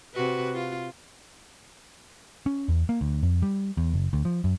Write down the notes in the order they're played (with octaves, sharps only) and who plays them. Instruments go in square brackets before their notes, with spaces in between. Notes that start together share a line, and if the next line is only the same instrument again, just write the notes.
[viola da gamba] C3 F#4 B4
F4
[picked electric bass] C#4
E2
A#3
D2
F2
G3
E2
F#1
D2
F3
F#2